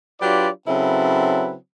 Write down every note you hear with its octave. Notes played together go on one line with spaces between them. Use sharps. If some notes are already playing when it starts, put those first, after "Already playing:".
F#3 D4 F4 G4 B4 D5
C#3 F#3 C4 E4 A4 B4